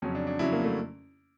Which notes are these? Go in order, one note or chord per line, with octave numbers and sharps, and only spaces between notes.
F2 C#3 F#3 C#4
D4
D4
F2 C#3 F#3 E4
A#3
A3